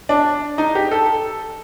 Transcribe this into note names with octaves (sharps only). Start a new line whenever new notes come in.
D4
D#4
G4
A4